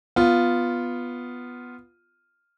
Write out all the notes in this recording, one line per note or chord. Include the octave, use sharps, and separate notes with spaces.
B3 F4